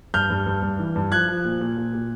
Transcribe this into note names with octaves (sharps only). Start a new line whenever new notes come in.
G2 F6 G6
G2
G2
G2
E3
G2
F3 F#6 G#6
F3
A#2
A#2
A#2
A#2